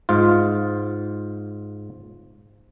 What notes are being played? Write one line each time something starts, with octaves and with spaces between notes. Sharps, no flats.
G#2 F4